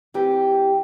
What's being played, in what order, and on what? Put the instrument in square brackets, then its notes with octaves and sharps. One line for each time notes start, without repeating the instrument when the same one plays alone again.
[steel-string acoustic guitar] E3 C4 G4